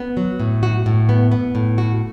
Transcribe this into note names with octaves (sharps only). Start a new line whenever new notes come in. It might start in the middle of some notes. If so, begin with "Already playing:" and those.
Already playing: B3
F#3
A2
F#4
A2
B3
B3
A2
F#4